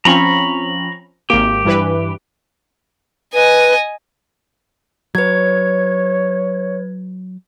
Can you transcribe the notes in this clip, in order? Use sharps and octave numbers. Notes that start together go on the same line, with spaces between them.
F3 C4 C#4 A#5 B5 C#6
G#1 A#3 G4
G2 E3 B4
B4 D#5 G#5
F#3 B4 C#5 G#6